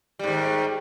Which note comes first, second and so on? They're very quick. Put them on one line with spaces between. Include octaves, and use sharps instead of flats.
G3 G#2 D#3